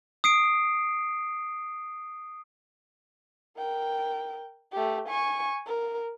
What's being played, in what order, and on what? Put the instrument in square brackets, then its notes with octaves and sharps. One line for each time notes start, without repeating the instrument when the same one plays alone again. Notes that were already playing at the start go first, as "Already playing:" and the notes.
[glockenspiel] D#6 C7 D7
[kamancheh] A#4 G5
A3 G4
G#5 C#6
A#4